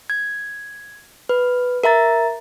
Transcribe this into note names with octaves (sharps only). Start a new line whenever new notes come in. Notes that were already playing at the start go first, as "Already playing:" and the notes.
G#6
B4
A#4 E5 A#5 A6